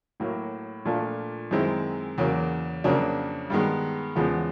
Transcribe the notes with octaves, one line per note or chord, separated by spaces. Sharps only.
A2 F#3 A#3
A#2 F3 A3 D4 F4
F#2 D#3 G#3 C4 E4
E2 C#3 F#3 A#3
F2 C#3 F#3 A#3 D4
G2 D#3 G#3 B3
E2 C#3 F3 G#3 B3